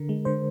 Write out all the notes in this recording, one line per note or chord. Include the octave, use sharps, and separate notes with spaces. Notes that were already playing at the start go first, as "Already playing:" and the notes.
Already playing: D3 A#4
G#3
D3 C5